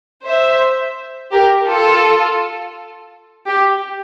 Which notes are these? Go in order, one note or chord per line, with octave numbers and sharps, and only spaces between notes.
C5 E5
G4 A#4
F4 A4
G4